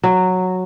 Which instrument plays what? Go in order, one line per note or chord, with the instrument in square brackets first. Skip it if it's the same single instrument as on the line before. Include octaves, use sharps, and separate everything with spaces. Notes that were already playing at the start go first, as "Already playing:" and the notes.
[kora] F#3